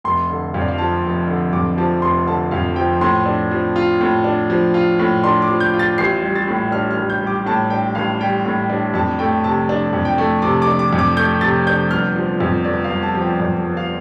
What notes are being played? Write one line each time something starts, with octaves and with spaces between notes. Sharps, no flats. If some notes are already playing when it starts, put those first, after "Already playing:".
F1 C6
D3
F2 F5
D5
F5
F3 A5
F1
D3
F2 D6
F3 A5
F1 C6
D3 A5
F2 F5
F3 G5
A2 C6
D4
F3
F4
A2
D4
F3
F4
A2
D4 C6
D6
F3
G6
F4
A6
A1 C7
G3
A6
A2
D4 F6
F6
A1
G6
G3
D6
A2 A5
D4 G5
A1 F5
G3 G5
A2
D4
F2 A5
A3 G5
C3 A5
D4
F2
G5
A3
C3 D6
D6
D4
D6
F2
D6
A3 G6
C3 A6
D4 G6
G1 F6
F3
F2
G1 D5
F5
G1
A5
F3
G5
F2 D5
G1
F5